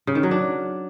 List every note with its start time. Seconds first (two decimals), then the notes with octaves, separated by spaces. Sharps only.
0.07 C#3
0.15 D#3
0.23 F#3
0.31 D4